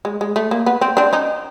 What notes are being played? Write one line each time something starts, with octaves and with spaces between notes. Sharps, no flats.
G#3
G#3
A3
A#3
B3
C4
C4 D4
C#4 D#4